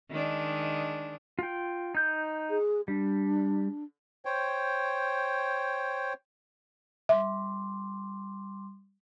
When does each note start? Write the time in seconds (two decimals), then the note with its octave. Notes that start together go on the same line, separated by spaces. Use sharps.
0.11 D#3 G#3 D4
1.39 F4 G5
1.95 D#4 G6
2.50 G#4
2.88 G3 D4
4.25 C5 C#5 G5
7.09 G3 E5 C6 D6